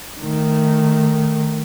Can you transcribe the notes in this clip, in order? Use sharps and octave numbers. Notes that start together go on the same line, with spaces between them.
D#3 A3